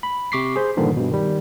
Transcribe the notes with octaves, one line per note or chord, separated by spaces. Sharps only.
B5
C3 C#6 D6 B6 C7
G#4 C5
G2 A#2 D3 D#3 F3
G2 B2
D#3 G3